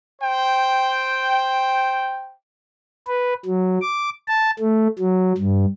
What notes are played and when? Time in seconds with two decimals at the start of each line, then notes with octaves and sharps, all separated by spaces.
0.22 C5 G5
3.07 B4
3.46 F#3
3.81 D6
4.28 A5
4.59 A3
4.99 F#3
5.38 G2